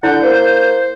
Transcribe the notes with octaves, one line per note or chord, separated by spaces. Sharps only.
D3 E4 F#5 G6
A#3 C5